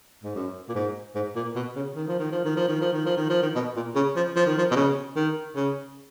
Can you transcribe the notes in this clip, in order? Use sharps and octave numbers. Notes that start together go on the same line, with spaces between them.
G#2
F#2
A#2
G#2
G#2
A#2
B2
C#3
D#3
F3
D#3
F3
D#3
F3
D#3
F3
D#3
F3
D#3
F3
D#3
B2
A#2
C#3
F3
F3
D#3
F3
B2
C#3
D#3
C#3